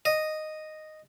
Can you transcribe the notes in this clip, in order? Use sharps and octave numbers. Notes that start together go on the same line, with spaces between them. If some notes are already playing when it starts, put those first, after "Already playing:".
D#5